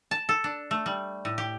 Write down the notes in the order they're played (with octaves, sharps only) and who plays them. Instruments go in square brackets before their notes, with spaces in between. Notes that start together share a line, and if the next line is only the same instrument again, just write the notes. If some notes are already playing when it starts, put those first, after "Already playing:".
[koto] A5
A4
D4
A3
G3
A2
G4